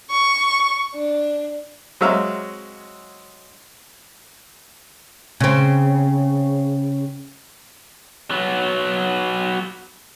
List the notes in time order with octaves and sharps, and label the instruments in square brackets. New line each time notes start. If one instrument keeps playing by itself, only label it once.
[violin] C#6
D4
[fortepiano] F#3 G#3 C4 E5 F5 A#5
[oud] C#3 C4
[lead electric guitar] F#3 B3